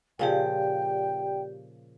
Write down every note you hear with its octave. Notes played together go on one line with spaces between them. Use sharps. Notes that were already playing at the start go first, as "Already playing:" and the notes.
A#2 C#3 F3 G4 D5 G5